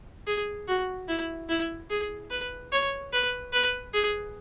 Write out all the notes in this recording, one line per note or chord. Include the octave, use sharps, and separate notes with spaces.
G#4
F#4
E4
E4
G#4
B4
C#5
B4
B4
G#4